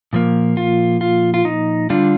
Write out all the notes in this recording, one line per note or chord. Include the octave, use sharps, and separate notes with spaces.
A#2 F3 A#3
F4
F4
F4
D#4
D3 G3 D4 F4